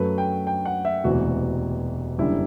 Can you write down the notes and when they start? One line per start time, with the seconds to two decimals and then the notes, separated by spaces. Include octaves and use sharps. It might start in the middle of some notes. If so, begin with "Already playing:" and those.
Already playing: F#2 F#3 A3 B4
0.18 G5
0.47 G5
0.65 F#5
0.85 E5
1.04 E1 D2 C3 E3 F#4
2.18 F#1 F#2 D3 G3 E4